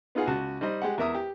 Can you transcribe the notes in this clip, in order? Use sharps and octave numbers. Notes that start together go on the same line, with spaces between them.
B3 D#4 F4 G#4 F#5
C#2 F#4 A5
G3 D#4 C5 D#5
G#3 G4 F#5
E2 A#4 E5 D#6
G4